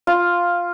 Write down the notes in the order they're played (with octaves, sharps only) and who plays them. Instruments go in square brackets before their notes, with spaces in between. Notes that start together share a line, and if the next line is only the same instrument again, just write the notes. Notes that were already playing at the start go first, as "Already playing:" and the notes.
[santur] F4